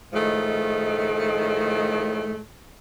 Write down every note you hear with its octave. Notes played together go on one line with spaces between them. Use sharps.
A2 D#3 F3 G#3 A3